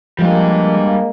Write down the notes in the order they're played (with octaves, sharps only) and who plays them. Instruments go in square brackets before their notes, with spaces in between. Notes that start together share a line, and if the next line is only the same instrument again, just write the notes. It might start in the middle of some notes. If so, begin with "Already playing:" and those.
[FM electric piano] F3 [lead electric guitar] G3 D4 [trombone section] G#3 A#3